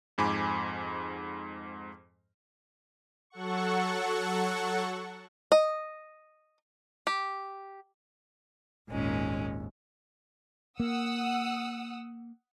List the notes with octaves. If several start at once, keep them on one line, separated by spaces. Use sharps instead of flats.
F2 G#2 G#5 B5 D6
F#3 A4 F#5 C#6
D#5
G4
G#1 D#2 A#2 G#3 C#4
A#3 F#5 D#6 E6